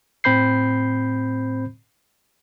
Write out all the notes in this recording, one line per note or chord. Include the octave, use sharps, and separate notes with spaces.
A2 C4 C5 B5 G6 C7